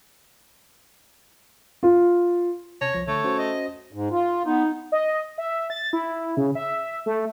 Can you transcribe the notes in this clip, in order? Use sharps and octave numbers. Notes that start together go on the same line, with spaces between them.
F4
C3 C#5 A5 A#6
C2 F3 A#6
D3 A3 C#5
C#4 F#4 C5
D#5
G#2
F4
B3 D#4
D#5
E5
A6
E4
C#3
E5
A3